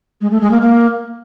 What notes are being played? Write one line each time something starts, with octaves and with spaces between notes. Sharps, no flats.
G#3
A3
G#3
A#3
A#3